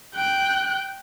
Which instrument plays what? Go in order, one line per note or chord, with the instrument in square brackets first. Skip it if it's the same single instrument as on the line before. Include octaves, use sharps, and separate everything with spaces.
[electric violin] G5 F#6